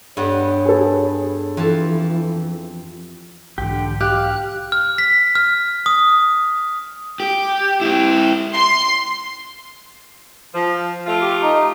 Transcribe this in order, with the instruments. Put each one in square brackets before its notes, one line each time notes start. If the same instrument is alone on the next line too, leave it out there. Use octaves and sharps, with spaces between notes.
[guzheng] G2 B3 [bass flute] C#5
[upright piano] G#4 A4
[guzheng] F2 A5 [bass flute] E3
[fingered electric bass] B1 G#2 E3 [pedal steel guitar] D3 G4
[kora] G4 [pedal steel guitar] F5 [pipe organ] F#6
[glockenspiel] F6
B6
F6
D#6
[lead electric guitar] G4
E4 G4
[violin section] C6
[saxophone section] F3
A3 F4
[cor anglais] G4
D#4